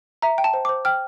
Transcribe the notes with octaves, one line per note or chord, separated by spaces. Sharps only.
E5 A#5
G5
A5
C5
C5 D6
G5 F6